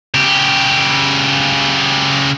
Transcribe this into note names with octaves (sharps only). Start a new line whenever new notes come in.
C#3 G4